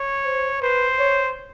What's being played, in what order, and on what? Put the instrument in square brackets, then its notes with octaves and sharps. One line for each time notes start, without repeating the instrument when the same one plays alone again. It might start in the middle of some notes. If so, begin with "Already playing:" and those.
Already playing: [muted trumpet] C#5
[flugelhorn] C5
[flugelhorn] B4 [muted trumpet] C5
[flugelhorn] C#5